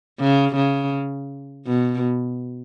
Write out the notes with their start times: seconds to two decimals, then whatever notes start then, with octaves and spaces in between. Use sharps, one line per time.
0.20 C#3
0.57 C#3
1.67 B2